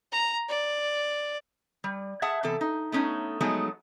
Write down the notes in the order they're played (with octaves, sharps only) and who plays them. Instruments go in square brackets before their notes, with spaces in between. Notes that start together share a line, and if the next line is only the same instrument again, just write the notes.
[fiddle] A#5
D5
[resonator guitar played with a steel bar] G3
G#4 E5 F#5 A5
C3 E3 B3 A4
D#4
A3 B3 C#4 D#4
F3 F#3 G#3 A3 B3 D#4